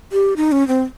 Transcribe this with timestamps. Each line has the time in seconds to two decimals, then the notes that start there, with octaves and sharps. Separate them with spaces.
0.12 G4
0.37 D#4
0.52 C#4
0.68 C4